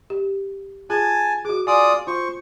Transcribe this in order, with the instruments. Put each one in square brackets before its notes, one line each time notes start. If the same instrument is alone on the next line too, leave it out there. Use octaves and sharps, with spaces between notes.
[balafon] G4
[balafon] F4 G#4 [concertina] G#5 A5
[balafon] F#4 G#4 [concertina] D6
[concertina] F4 D5 D#6 [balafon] G#5
[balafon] F4 [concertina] C5 C#6